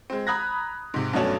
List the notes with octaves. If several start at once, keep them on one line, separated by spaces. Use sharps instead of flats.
G#3 C4
A#5 B5 D#6 F#6 G#6 A#6
G#2 C3
G2 B2 F#3 A3 C#4 D4